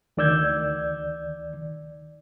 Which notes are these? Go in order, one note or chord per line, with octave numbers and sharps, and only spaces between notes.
D2 D#3 D5 E6 G6 G#6